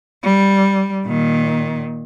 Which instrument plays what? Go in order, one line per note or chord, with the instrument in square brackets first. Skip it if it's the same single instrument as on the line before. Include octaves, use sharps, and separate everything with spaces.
[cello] G3
A#2 D#3